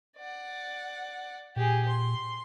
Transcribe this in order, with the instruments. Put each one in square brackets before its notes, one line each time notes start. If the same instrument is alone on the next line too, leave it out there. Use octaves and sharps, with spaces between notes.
[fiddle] D5 F#5
[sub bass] A#2 [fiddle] G4 G#4
[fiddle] C6